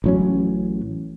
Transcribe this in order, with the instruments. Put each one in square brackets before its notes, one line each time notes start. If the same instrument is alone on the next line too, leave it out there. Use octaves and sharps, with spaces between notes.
[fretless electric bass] A1 F#3 C#4